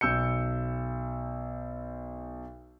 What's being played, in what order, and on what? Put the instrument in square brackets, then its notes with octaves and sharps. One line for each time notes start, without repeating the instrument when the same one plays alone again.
[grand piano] B1 E6 G6 C#7